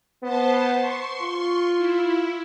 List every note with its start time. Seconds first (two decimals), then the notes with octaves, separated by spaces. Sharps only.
0.23 B3 C5 A5
0.77 C6 C#6
1.21 F4
1.78 E4